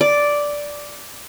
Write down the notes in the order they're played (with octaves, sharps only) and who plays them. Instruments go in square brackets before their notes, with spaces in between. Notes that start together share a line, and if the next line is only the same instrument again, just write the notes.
[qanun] D5